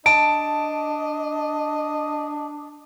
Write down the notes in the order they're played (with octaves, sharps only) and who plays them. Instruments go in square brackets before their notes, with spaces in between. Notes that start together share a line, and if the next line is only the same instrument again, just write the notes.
[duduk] D4 [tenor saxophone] D#5 [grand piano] A5 [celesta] D7